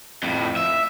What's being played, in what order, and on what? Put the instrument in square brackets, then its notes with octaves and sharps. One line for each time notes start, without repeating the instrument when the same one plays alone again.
[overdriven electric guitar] F2 A2
E5